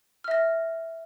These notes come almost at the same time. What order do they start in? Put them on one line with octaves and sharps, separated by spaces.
F6 E5 A#6